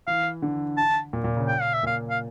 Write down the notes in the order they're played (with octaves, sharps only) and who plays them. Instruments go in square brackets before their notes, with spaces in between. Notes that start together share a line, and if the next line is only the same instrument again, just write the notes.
[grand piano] E3 [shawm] F5
[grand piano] D3
[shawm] A5
[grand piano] A#2
A#2
C#3
[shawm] G5
F5
E5
[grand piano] A#2 [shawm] F5
[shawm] F5